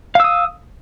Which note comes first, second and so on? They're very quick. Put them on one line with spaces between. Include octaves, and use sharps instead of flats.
F5 E6 D#6